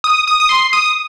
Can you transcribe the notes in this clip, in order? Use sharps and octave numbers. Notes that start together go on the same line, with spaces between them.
D#6
D#6
D#6
C6
D#6